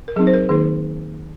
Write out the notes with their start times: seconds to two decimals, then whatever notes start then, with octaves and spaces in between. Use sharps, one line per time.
0.08 A#4
0.16 F#3 C4 D#4 G#4
0.27 C5
0.34 A#4
0.49 D#3 A#3 D#4 G#4